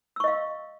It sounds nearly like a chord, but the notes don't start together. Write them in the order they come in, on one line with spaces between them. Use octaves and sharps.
E6 C#6 D#5 F5